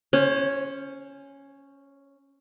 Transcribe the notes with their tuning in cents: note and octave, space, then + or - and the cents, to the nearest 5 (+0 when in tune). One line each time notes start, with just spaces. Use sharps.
C#4 +0 C5 +35